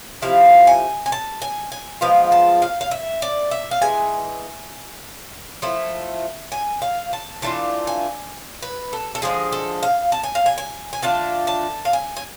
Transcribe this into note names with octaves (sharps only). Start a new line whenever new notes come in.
C3 F3 A3 E4 F5
G#5
G#5
A5
G#5
G#5
F3 G#3 B3 F4 F5
A5
F5
F5
E5
D5
E5
F5
E3 G#3 G#5
F3 A3 E4
G#5
F5
A5
E3 A3 D4 F4 A5
G#5
B4
A4
A4
D3 F3 G#3 G#4
A4
F5
A5
G#5
F5
G#5
G#5
G#5
D3 A3 D4 F4 A5
A5
F5
G#5
G#5